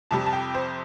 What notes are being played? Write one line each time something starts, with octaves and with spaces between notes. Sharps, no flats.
F2 C3 G3 A5
A5
G5
C5